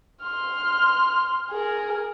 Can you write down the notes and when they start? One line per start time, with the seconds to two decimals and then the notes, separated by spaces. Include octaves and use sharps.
0.23 C6 F6
1.50 G#4 A#4